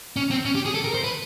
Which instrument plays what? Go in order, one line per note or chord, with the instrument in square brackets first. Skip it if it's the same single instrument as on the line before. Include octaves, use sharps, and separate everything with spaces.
[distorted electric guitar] C#4
C4
C#4
G4
G#4
A4
A#4
C5
B4